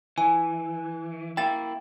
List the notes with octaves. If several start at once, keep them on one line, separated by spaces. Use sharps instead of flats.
E3 G#5
A#3 E4 G5 A6